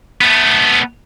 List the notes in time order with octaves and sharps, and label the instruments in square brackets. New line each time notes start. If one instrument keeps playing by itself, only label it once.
[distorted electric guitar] A3 B3